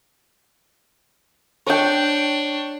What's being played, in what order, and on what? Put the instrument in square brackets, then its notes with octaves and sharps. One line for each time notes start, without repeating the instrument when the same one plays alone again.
[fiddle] D4 [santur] C#5 G5